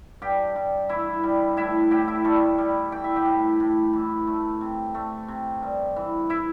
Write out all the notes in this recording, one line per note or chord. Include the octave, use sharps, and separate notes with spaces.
G2 G4 G5
G2
E3 E4 E5
G3
A2 E4 E5
A2 G4 G5
E4 E5
G3 A3 A4
G3
E3 G5
E5
G4 G5
A2
A2
E3
A3
C3
A3
C3
G2
E3
E4 E5